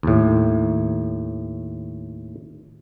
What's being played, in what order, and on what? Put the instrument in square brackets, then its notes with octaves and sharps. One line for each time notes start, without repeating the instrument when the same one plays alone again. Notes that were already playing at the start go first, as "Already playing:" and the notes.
[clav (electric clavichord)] D#2 A2